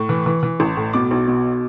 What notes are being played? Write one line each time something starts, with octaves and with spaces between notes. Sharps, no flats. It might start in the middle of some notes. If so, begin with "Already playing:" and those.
Already playing: A2 C#6
E3
E3
E3
A1
A2
B2 D6
B1
B2